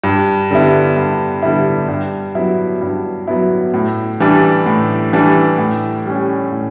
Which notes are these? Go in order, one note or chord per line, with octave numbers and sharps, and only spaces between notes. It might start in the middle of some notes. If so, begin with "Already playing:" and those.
G2
D3 G3 B3 E4
G2
D3 G3 B3 E4
G2
F#3 B3 E4
G2
F#3 B3 E4
A2
E3 G3 D4
A2
E3 G3 D4
A2
G3 C#4
A2